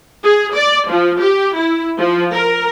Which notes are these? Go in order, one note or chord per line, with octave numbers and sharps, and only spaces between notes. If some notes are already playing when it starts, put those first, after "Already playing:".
G#4
D5
F3
G4
E4
F3
A#4